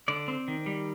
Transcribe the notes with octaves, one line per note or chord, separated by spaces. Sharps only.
D3 D5
C4
D#3
G3